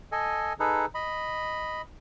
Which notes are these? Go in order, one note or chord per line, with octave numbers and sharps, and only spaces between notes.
A4 D#5 G#5
D#4 G#4 A4 B4
D#5 B5